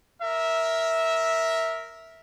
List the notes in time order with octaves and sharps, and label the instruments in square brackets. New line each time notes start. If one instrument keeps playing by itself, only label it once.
[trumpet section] A#4 E5